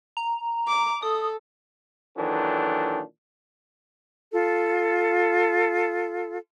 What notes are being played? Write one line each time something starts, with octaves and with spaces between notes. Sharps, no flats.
A#5
D6
A4 D#6
A#2 D#3 E3 F#3 D4 A4
F4 A4